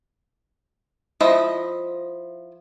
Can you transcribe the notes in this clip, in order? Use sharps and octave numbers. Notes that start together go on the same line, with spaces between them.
F3 E4 D#5 E5